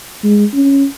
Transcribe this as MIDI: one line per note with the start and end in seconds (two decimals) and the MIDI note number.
0.24 0.45 56
0.54 0.85 61